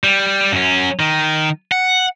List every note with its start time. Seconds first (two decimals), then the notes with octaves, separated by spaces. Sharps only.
0.04 G3
0.52 F#2 C#4
1.00 D#3
1.72 F#5